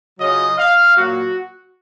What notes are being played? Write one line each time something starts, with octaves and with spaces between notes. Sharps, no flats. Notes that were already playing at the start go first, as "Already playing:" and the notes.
C#3 F#3 C#4 F4 D#5
F5
A#2 F#3 A#3 F#4